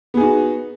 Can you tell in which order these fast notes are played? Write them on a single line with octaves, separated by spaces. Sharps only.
B3 G#4 D#4 F#4